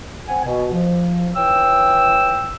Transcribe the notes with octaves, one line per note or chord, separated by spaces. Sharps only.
C4 F#5 G#5
B2
F3
E3 C#5 G5 E6